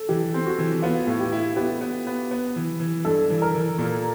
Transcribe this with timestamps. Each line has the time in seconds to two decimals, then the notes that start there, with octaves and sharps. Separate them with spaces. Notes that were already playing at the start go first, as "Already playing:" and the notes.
Already playing: A4
0.09 E3 G4
0.34 C4
0.46 F#4
0.58 E3
0.82 B3 F4
1.07 A2
1.20 G4
1.32 E4
1.56 B3 G4
1.81 B3
2.07 B3
2.31 B3
2.56 E3
2.80 E3
3.05 G2 A4
3.30 E3
3.42 A#4
3.55 E3
3.78 A#2